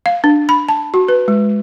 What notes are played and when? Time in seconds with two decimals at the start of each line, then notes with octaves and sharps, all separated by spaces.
0.06 F5
0.24 D4
0.49 B5
0.69 A5
0.94 F#4
1.08 B4
1.28 G#3